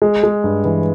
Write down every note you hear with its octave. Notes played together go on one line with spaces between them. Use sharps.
G#3
G#3
G2
E3